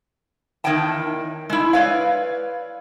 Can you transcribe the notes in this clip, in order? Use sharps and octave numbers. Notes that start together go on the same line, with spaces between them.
E2 D#3 C#5 D#5 G5 A5
G#3 E4
B4 C#5 D5 F5